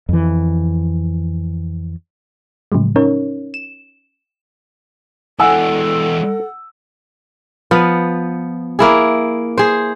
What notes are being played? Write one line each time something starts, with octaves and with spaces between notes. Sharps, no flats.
F2 E3
A2 C#3 F3 F#3 G#3
C#4 D#4 A#4 C#5
E7
E3 G#3 A4 F#5 G#5 E6
F3 B3
A#3 E4 G#4
G#4 C5